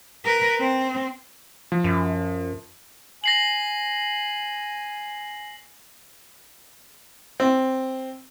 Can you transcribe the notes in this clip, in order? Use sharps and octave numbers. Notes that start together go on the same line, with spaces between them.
A#4 B4
C4
F3
F#2
G#5 A#6 C7 F#7
C4